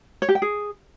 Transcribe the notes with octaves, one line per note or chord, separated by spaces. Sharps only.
C#5
G4
G5
G#4